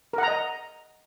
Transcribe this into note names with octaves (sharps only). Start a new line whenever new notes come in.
A#4 D#5 F#5 A#5